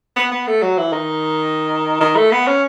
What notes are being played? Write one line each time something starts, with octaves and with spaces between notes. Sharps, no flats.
B3
B3
A3
F#3
E3
D#3
D#3
A3
B3
C#4